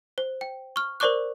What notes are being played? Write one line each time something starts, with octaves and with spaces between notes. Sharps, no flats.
C5
G5
C#6 F6
A#4 C5 D5 C#6 D6 F#6